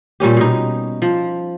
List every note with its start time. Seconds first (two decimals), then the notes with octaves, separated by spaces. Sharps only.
0.20 A#2 G3 C#4 G4
0.37 B2 D#4
1.02 F3